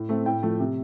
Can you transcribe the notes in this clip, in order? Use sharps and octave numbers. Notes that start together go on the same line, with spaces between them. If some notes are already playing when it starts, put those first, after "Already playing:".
Already playing: A2
A3 C4
A2 G5
F3 A3
C3